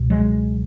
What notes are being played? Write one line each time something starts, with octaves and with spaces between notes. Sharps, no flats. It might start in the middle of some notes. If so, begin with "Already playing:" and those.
Already playing: C#2 B2
F#3 G#3